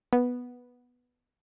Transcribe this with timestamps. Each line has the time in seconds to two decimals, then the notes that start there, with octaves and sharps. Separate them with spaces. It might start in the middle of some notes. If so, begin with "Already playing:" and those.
0.13 B3